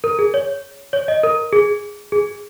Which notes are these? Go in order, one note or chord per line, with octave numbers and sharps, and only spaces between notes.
A#4
G#4
C#5
C#5
D#5
A#4
G#4
G#4